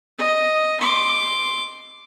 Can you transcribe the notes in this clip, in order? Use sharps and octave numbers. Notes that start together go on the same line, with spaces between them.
D#5
C6 D6